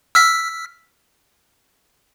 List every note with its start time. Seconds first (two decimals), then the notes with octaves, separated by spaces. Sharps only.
0.15 E6 F6 B6